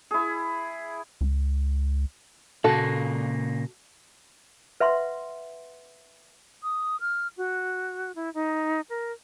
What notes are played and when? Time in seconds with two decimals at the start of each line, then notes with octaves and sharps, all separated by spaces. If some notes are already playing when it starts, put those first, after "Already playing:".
0.11 E4 G#4
1.21 C#2
2.64 A#2 C#3 A#3 F#4 A4
4.80 B4 E5 F#5 C6
6.63 D#6
7.00 F6
7.37 F#4
8.16 E4
8.34 D#4
8.90 A#4